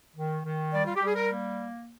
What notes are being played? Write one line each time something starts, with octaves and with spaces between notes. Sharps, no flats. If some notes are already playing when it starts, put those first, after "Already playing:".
D#3
D#3
G3 D5
F4
G4
G3 G#4
A#4
A#3